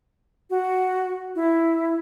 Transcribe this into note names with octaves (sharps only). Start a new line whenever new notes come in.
F#4
E4